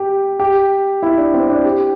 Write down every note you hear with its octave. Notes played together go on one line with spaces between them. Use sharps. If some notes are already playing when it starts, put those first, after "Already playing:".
Already playing: G4
G4
E4
D4
C4
D4
G4